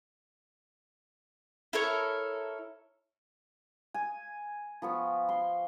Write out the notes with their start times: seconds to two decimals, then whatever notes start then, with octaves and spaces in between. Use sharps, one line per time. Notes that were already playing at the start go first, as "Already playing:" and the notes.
1.73 E4 A4 A#4 C#5
3.94 G#5
4.82 F3 B3 C#6
5.29 C6